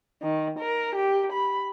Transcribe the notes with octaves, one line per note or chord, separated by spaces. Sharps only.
D#3
A#4
G4
B5